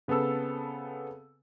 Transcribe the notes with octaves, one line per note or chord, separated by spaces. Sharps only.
C#3 B3 C4 A4 E6